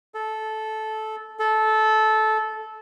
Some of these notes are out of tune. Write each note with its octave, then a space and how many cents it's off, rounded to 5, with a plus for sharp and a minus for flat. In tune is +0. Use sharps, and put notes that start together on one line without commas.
A4 -15
A4 -15